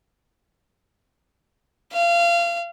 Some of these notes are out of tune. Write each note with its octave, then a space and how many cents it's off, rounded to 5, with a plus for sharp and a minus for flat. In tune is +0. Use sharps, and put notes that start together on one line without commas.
F5 -30